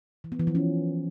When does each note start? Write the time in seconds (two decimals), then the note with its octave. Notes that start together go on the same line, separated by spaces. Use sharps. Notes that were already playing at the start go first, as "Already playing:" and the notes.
0.24 E3
0.32 B3
0.40 E3
0.47 F3
0.55 C#4